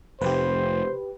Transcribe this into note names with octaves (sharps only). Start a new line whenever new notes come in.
F1 G4 B4 C5